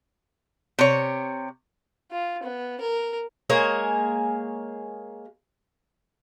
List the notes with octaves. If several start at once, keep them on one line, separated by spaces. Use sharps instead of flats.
C3 C#5
F4
B3
A#4
G#3 A#3 G#4 C#5